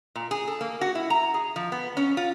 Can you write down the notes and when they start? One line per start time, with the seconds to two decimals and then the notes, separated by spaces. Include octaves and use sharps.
0.16 A#2
0.31 G#4
0.47 A4
0.61 A#3
0.81 F#4
0.95 E4
1.10 A#5
1.34 G#4
1.56 F3
1.72 B3
1.97 C#4
2.17 F4